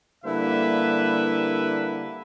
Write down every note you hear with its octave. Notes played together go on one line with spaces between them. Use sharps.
D3 G3 A#3 E4 B4 E5